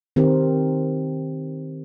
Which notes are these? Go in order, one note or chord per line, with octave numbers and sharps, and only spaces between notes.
D#3 C4 G4 A#4